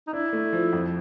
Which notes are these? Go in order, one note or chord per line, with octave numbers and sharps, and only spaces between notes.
D#4
D4 E4
A3
F3
F2